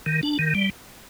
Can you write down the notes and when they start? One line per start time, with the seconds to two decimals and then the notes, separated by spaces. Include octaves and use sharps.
0.06 D#3
0.23 D4
0.39 D#3
0.55 G3